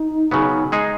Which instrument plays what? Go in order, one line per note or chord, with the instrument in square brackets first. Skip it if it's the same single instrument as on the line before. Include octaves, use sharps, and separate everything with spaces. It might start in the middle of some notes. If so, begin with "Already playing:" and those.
Already playing: [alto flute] D#4
[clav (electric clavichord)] C#3 F#3 B3
G#3 D#4 G#4